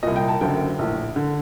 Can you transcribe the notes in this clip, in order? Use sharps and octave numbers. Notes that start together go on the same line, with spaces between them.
C2 A#2 D#5
G5
A5
F#1 F#2 D3 G5
A#1 A2
D3